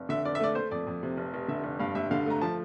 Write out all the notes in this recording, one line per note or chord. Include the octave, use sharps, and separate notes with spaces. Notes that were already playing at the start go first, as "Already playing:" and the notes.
Already playing: F1
D3 E5
F1 D5
E5
A3 D5
A3 C5
F2 D5
F2
C3
F1
F1
D3 E5
F1
G2 F5
G2 E5
D3 F5
A3 A#5
F3 A5